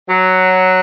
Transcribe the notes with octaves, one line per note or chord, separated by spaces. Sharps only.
F#3